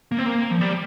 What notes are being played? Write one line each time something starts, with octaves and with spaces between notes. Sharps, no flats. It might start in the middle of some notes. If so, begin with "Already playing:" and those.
A#3
C4
A#3
F3
G3